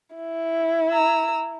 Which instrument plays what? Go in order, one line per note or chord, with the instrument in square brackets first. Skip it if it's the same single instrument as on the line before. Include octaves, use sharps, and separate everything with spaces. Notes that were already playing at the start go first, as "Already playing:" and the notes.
[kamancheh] E4
[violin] A#5 E6